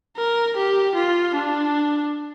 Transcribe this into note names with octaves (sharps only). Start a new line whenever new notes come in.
A#4
G4
F4
D4